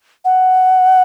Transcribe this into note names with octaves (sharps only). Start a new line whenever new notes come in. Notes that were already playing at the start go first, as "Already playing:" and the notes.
F#5